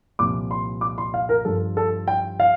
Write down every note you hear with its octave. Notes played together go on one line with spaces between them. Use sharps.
C2 A#2 F3 D6
C6
D6
C6
F5
A#4
G2 F3 A4
A4
G5
F5